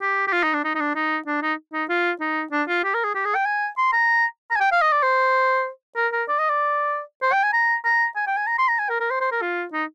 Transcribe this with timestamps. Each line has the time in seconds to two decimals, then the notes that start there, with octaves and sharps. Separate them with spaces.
0.02 G4
0.28 G4
0.33 F4
0.43 D#4
0.54 D4
0.64 D#4
0.75 D#4
0.80 D4
0.95 D#4
1.27 D4
1.42 D#4
1.73 D#4
1.89 F4
2.21 D#4
2.52 D4
2.68 F4
2.84 G4
2.94 A#4
3.04 G#4
3.15 G4
3.25 G#4
3.35 G5
3.46 G#5
3.78 C6
3.93 A#5
4.51 A#5
4.56 G#5
4.61 G5
4.72 F5
4.82 D#5
4.92 D5
5.03 C5
5.97 A#4
6.12 A#4
6.29 D5
6.39 D#5
6.49 D5
7.22 C5
7.33 G5
7.43 G#5
7.53 A#5
7.85 A#5
8.16 G#5
8.27 G5
8.37 G#5
8.47 A#5
8.58 C6
8.69 A#5
8.79 G#5
8.89 A#4
9.00 A#4
9.11 C5
9.21 C5
9.32 A#4
9.42 F4
9.73 D#4